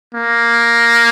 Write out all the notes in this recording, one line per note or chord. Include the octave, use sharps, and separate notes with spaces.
A#3